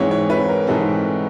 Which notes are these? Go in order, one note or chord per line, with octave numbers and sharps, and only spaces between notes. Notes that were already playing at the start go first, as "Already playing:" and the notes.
Already playing: G#2 E3 G#3 C4 C#5
C#5
B4
A#4
G#2 E3 G#3 C4 A4